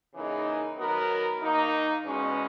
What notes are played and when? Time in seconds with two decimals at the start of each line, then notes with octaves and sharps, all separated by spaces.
0.14 C#3 E3 A#3 D#4 G#4
0.78 D#3 F#3 B3 F#4 A#4
1.40 D#3 A#3 D#4
2.04 E2 B2 G#3 C#4